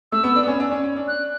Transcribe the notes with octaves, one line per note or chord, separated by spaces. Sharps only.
A3 E6
B3
D4
B3
C#4
D4
C#4
C#4
D4
F#6